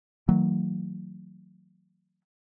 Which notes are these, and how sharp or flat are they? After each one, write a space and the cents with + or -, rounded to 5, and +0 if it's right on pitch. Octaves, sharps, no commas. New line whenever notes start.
D#3 +45 F#3 +0 A3 +45